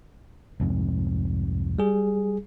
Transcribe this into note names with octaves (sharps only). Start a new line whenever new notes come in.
C2 F2 G#2
G3 G#4